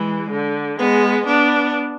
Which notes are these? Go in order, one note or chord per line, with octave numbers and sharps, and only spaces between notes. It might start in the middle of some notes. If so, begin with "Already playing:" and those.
Already playing: E3 G#3
D3
G#3 B3
B3 D4